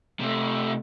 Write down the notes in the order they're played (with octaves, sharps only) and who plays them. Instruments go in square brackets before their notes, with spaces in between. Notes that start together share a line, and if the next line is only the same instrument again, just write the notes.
[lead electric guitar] C3 A3